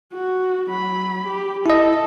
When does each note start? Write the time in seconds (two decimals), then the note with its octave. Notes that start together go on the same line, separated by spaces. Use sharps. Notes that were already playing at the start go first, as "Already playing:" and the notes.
0.13 F#4
0.69 F#3 B5
1.28 G4
1.66 E4 A4 D#5